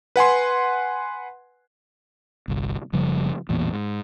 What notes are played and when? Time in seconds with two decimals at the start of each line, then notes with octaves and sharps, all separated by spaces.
0.16 B4 F#5 G#5 C6
2.48 G1 C2
2.93 F#1 C#3 F3 G3
3.49 A1 E2 A#2
3.73 G#2